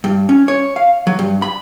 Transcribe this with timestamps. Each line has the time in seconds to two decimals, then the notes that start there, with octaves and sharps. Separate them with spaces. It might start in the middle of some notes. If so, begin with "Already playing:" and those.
0.04 G2
0.29 C#4
0.48 C#5
0.76 F5
1.07 F#3
1.19 G2
1.42 B5